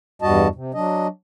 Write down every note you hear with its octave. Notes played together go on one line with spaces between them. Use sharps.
E2 G2 G3 F#4 D#5 A5
C3
F#3 D4 D#5